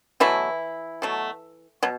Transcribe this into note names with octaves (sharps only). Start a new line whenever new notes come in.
B2 E3 F#3 A3 E4
B2 F#3 A3
B2 F#3